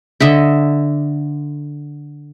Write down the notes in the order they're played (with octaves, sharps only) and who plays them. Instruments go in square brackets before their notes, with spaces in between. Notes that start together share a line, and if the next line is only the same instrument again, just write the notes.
[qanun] D3 D#5 E5